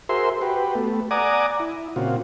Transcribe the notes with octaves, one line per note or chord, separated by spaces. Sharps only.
F#4 G#4 A#4 C5 E5 C6
F#4 G4 B4
A3 B3
D5 F#5 G#5 A#5 D6 D#6
E4
A#2 C#3 C4 F4 F#4